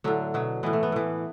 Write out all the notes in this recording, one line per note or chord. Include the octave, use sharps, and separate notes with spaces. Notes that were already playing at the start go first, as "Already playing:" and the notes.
A2 D3 F#3 D4
B2 F#3
A2 E3 B3
A3
B3
A2 E3